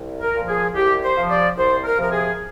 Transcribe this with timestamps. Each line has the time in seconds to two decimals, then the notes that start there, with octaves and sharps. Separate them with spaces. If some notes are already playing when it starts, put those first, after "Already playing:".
Already playing: C2
0.20 A#4
0.34 A#2 F3
0.48 G#4
0.75 C2 G4
1.02 C5
1.16 C3 F3
1.29 D5
1.57 C2 C5
1.84 A#4
1.98 C3 F3 A#4
2.12 G#4